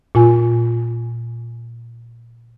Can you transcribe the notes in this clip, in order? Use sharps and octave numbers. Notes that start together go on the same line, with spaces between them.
A#2 F4 G#5